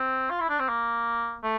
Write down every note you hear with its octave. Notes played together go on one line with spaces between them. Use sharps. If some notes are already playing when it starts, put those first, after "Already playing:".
Already playing: C4
F4
E4
D4
C4
A#3
A3